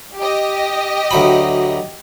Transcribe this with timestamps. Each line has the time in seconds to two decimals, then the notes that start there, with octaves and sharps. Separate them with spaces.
0.18 G4 D#5
1.11 D2 F#3 B5